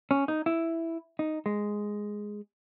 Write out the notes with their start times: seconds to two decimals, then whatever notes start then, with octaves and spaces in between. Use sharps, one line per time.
0.11 C#4
0.28 D#4
0.46 E4
1.19 D#4
1.46 G#3